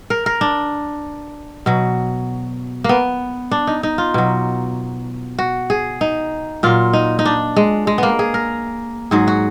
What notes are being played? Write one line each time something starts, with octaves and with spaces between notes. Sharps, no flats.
A#4
A#4
D4
B2 F#3
A#3 B3
D4
D#4
D#4
F4
B2 F#3
F#4
G#4
D#4
A#2 F#3 F4
D#4
D#4
D4
G#3
G#3
A#3 B3
G#4
A#4
G#2 F#3 G#4
F#4